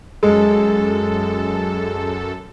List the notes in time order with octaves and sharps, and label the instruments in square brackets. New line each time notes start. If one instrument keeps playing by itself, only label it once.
[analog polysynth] F#2 A4 [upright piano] G#3